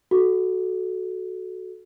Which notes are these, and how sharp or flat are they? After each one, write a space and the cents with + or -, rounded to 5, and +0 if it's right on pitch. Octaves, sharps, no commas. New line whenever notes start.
F#4 +0 A4 -20